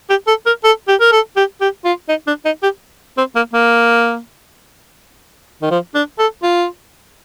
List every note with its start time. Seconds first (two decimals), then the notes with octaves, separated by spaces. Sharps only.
0.10 G4
0.28 A4
0.46 A#4
0.64 A4
0.88 G4
1.01 A#4
1.12 A4
1.36 G4
1.61 G4
1.85 F4
2.09 D#4
2.27 D4
2.45 D#4
2.63 G4
3.18 C4
3.36 A#3
3.54 A#3
5.62 D#3
5.71 F3
5.95 D4
6.19 A4
6.43 F4